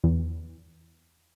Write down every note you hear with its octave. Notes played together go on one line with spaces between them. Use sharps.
E2